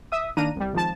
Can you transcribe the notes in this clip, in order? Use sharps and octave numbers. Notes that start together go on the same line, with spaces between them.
E5 D#6
D#3 A#3 D4 A#5 D#7
C2 G3
G#1 F3 A5